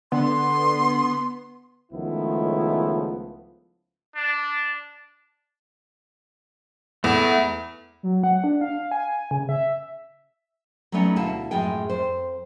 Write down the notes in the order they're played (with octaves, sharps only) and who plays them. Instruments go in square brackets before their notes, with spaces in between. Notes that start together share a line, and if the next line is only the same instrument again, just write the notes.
[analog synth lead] D3 [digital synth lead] B3 [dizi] C6
[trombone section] C#2 D#3 F3 A3 B3 E4
[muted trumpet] D4
[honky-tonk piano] E2 [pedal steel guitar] A3 E4
[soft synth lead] F#3
F#5
D4
F5
G#5
C#3
E5
[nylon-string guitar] F#3 G3 A3 B3 C#4 D#4
D2 B2 E4 F5 A5
F#2 A2 F3 G#3 G#4 G5
F2 C5